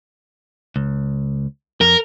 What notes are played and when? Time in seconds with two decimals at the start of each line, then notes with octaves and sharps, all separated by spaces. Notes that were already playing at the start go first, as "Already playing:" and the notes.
0.76 C#2
1.81 F2 A#4